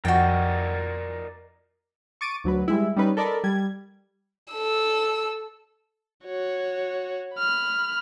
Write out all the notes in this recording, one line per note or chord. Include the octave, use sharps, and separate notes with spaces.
F2 F#4 A#4 D5 D#5 G5
C#6 D6 A6 D7 D#7
D2 F#3 B4
G3 G#3 E4
G3 C#4 D#4 B4
A4 A#4 D5 D#5 A5 B5
G3 G#6
A4 E6
F#4 C#5
B5 F6